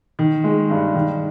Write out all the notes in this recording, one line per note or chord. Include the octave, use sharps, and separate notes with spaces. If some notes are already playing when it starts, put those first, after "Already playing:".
D#3
G#3
G2
D#3